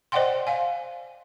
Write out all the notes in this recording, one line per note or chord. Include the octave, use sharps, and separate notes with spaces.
C5 D5 D#5 F#5 G5 C6
F5 G#5